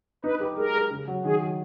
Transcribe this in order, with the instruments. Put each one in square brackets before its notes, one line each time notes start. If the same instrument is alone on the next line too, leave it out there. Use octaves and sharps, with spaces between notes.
[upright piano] D#4 [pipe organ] B4
[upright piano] G4
[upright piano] G#3 [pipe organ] A#4
[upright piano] G#3
C#3
F#3
[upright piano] D#3 [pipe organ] G#4
[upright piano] F#3